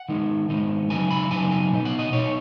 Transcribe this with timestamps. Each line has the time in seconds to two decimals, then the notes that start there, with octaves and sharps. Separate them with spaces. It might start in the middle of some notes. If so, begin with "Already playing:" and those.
Already playing: F#5
0.09 D#3 G#3 B3 D#4
0.49 D#3 G#3 B3 D#4
0.90 C#3 F#3 B3 D#4 G#5
1.11 B5
1.31 C#3 F#3 B3 D#4 G#5
1.51 G#5
1.71 B2 B3 D#4
1.85 F#5
1.99 D#5
2.12 B2 B3 D#4 C#5